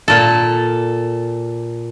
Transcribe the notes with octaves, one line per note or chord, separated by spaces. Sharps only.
A#2 A4